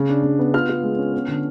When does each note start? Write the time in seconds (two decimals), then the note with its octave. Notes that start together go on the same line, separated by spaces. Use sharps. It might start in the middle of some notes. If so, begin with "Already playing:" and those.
Already playing: C#3
0.09 D4
0.23 C#3
0.39 B3
0.54 F4 F6
0.69 F4
0.83 G#3
0.98 C#4
1.13 B3
1.28 D3